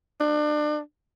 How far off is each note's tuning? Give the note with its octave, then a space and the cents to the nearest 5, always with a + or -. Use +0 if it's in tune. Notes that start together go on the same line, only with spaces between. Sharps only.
D4 +30